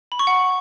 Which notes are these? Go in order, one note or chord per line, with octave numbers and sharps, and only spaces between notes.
B5
C#6
F#5